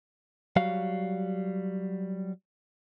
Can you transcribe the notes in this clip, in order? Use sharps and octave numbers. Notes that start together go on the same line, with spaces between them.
F#3 G3 F#4 F5